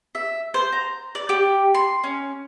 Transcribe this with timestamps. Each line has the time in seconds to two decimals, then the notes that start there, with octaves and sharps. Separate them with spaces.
0.15 E5
0.54 C5
0.72 A#5
1.15 D5
1.29 G4
1.75 C6
2.04 C#4